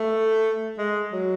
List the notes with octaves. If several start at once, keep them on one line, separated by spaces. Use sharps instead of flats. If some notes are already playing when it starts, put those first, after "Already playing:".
Already playing: A3
G#3
F#3